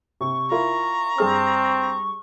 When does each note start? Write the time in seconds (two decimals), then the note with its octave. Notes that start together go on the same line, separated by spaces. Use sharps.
0.21 C3 C#6
0.51 E4 F4 A#4 A#5
1.18 G2 C4 G#4 F6